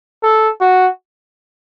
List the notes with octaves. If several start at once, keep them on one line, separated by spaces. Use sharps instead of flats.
A4
F#4